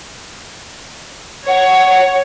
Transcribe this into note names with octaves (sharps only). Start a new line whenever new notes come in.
C#5 F#5